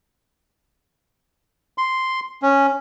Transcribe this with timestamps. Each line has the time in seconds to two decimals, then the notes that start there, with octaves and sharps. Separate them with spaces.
1.78 C6
2.42 C#4